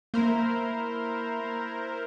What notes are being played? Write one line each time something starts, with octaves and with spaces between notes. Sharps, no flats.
A#3 E4 A#4 C5